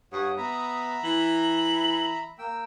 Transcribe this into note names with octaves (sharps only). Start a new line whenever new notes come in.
G2 C#5 F#5 D#6
B3 E5 A#5 B5
E3 F#7
A#3 G5 E6